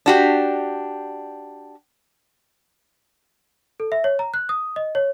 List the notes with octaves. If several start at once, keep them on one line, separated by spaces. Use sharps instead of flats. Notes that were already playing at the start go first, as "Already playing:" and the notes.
D4 F#4 G4
A4
E5
C#5
A#5
F#6
D#6
D#5
C#5